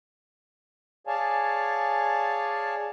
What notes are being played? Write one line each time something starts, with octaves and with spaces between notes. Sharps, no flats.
G#4 C#5 D5 F5 G#5 A5